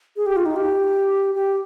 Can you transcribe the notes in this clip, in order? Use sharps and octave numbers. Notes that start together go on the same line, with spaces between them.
G#4
G4
F4
D#4
G4
G4